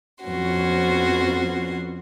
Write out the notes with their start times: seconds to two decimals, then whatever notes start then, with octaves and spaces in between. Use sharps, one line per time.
0.24 F2 F3 B3 C#4 F#4 C6